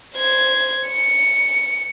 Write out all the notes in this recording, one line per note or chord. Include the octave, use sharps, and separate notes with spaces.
C5 G#6
C#7